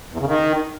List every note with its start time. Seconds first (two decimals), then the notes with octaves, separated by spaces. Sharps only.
0.13 E2
0.20 C#3
0.27 D#3